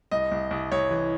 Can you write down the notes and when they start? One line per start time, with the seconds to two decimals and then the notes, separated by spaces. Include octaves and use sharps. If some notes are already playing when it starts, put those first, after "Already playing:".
0.11 C2 D#5
0.31 C2
0.51 C2
0.72 C2 C#5
0.91 E3